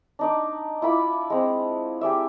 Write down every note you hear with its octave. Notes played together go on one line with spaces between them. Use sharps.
D4 D#4 D5
E4 F4 B5 D6
G#3 C4
G4 G#4 D5 E5